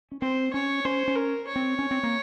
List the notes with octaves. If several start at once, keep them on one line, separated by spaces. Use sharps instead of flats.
C#4
C4 C5
C#4 C#5
C#4 C5
C#4
A#4
C#5
C4
C#4
C4
A#3